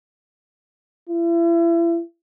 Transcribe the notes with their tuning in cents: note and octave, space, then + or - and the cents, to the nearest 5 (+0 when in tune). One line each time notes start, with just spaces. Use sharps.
E4 +35